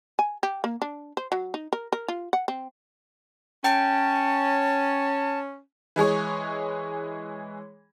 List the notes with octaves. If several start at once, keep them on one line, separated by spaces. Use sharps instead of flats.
G#5
G4
A#3
D4
C5
F#3
D#4
A#4
A#4
F4
F#5
C4
C#4 G5 A5
E3 G#3 G#4 C#5